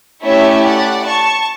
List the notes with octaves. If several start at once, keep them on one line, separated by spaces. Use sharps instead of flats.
A3 C#4 E4 G4 C#5 E5
D5 F#5
A5 C#6